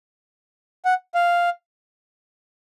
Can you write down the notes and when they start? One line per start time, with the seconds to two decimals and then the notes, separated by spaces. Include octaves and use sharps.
0.85 F#5
1.14 F5